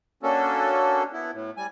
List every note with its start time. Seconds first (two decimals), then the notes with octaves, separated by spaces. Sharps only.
0.23 A#3 C#4 D4 F#4 A4
1.13 B3 E4
1.34 A2
1.57 G3 G#5